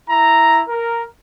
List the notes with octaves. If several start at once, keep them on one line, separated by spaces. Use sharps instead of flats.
E4 A#5
A#4